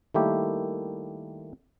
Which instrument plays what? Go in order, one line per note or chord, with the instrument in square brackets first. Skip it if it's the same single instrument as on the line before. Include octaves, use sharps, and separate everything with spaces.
[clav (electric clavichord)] D#3 G3 A3 A#3 E4 G4